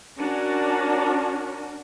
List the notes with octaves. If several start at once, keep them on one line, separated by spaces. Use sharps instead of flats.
C#4 D4 F#4 A#4